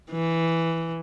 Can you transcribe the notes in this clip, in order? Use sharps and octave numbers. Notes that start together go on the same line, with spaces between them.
E3